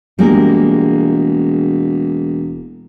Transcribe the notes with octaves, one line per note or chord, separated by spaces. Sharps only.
E1 G3 G#3 A#3